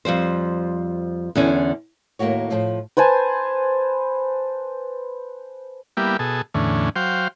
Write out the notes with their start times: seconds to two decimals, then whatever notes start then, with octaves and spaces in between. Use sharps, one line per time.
0.05 F2 F3 G3 C5
1.35 E2 D3 C#4
2.19 D#2 A2 A#3 E4 F#4 C#5
2.51 A2 F3
2.97 B4 C5 G#5 A5
5.97 G3 A#3 B3 E4 G4
6.19 B2 G#4 A4
6.54 E2 A2 D3 C#4
6.96 F#3 C5 F5 G5